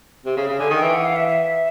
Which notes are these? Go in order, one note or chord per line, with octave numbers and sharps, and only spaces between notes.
C3
C#3
C#3
D3 G#5
D#3
E3 G5
F#5
F5
E5
E5